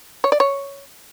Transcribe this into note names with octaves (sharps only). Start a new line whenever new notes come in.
C#5
D5
C#5